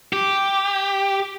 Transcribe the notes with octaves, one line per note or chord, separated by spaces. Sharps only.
G4